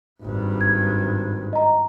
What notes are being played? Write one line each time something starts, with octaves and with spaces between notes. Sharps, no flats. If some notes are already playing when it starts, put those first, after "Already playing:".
G#1 G2
G#6
D#5 A#5